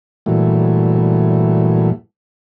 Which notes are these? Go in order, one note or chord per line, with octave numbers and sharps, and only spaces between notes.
G2 A#2 E3 F#3 A3